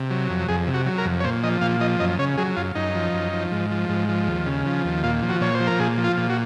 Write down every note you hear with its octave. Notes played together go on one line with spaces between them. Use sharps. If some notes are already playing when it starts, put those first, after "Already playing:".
Already playing: C3
F#3
F2
F2 G#4
C3
F#4
F#3
A#4
F2
C#5
A#2 C5
F3 D#5
A#2 F5
F3 D#5
F#2 D#5
C#3 C#5
F#3 G#4
F#2 F4
F#2 D#4
F3
F#2
F3
G#2
F3
G#2
F3
D#2
C#3
F3
D#2
A#2 F4
F3
F#4
A#2 C#5
C5
F3
A#4
A#2 G#4
F3
F4
A#2
F#4